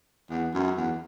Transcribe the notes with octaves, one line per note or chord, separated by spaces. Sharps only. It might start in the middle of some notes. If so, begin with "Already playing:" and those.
E2
F#2
E2